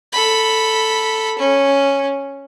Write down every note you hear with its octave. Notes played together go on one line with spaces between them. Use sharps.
A4 B5
C#4